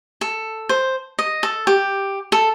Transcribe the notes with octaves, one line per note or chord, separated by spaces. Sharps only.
A4
C5
D#5
A4
G4
A4